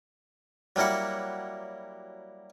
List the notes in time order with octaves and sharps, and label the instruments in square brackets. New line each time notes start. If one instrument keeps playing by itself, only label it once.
[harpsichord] F#3 G3 A#3 E4 F#5